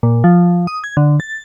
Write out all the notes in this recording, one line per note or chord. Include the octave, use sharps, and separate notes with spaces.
A#2
F3
D#6
G#6
D3
A6